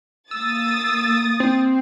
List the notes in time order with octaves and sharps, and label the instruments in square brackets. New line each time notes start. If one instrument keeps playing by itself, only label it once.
[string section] A#3 D#6 A6 [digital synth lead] E6
[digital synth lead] C4